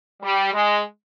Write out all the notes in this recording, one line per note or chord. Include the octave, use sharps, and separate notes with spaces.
G3
G#3